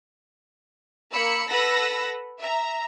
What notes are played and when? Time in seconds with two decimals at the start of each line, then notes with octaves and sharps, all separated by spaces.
1.12 A#3 B5 E6 C#7
1.49 A4 B4 F#5 B5 E6 A#6
2.38 E5 A#5